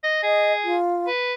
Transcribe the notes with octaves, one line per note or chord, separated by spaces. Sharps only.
D#5
G#4 D#5
F4
B4